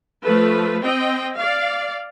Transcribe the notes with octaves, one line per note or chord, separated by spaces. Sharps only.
F3 A3 B4
C4 D#5 G5
D5 F5